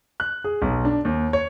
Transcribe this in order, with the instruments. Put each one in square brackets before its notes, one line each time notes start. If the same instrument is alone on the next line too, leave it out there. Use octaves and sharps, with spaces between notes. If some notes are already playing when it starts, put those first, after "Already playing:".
[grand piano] F#6
G#4
B1
D4
D#2
C#5